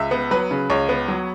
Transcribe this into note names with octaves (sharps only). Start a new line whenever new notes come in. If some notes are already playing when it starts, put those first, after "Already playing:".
Already playing: C#2 E5
B3
F#3 B4
C#3
C#2 C#5
B3
F#3